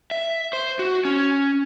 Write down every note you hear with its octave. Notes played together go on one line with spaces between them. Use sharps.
E5
C5
F#4
C#4